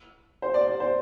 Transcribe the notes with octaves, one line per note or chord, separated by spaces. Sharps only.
C5
D5
D5
C5